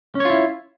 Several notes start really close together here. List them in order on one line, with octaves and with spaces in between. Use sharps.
C#4 C#5 F4 E4